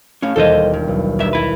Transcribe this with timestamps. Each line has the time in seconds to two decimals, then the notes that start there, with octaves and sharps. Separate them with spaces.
0.22 A2 C#4 F5
0.36 E1 D#2 G3 A4 C5 D#5
0.74 G2
0.88 B1
1.19 G2 E5
1.33 E4 B4